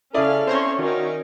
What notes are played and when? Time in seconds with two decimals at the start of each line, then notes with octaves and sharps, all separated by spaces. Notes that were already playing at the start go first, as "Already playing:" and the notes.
0.14 C#3 C#4 E4 G#4 A4 D5 F5
0.47 C4 C#4 C5 C#5 A#5 C6
0.79 D#3 C#4 D#4 F#4 A#4